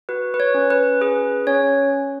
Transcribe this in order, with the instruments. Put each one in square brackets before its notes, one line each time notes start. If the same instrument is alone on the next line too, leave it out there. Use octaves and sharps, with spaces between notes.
[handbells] F#4 B4
B4
C#5
C#4
B4
G#4 B4
C#4 C#5